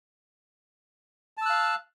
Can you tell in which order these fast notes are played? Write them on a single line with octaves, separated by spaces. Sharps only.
A5 E6 F#6 F5